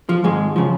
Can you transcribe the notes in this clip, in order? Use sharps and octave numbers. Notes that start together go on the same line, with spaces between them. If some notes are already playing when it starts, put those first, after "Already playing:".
F3
G#2 D#3 G#3
C#3 F3